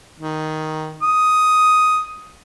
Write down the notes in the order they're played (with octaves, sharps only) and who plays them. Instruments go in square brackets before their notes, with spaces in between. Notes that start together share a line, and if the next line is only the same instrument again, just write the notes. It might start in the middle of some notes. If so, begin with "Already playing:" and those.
[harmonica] D#3
D#6